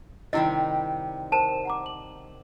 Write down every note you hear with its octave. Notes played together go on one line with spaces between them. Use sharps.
C3 D#3 G3 E4 D#5
A#4 C5 A5 E7
F#5 A#5 D6
F#7